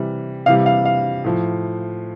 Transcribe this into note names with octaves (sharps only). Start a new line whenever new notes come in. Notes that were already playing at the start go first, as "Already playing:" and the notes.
Already playing: C3 E3 G3
C3 E3 G3 F5
F5
F5
A2 F3